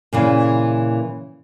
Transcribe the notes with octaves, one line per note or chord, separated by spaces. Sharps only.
A#2 C#3 E3